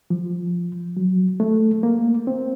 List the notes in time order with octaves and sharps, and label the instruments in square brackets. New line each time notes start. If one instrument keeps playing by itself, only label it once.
[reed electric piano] F3
F#3
A3
A#3
C4